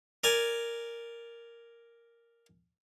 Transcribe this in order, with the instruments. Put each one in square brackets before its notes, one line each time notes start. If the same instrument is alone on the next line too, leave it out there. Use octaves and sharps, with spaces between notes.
[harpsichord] A#4 D5 G#5